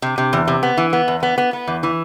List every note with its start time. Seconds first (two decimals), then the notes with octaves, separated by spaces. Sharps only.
0.02 C3
0.18 C3
0.33 E2
0.48 C3
0.63 B3
0.77 E3
0.93 B3
1.08 E2
1.23 B3
1.38 B3
1.53 B3
1.67 E2
1.83 E3